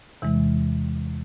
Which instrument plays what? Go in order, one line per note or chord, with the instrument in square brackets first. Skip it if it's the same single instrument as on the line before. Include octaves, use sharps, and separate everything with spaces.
[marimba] E2 C3 E3 G#3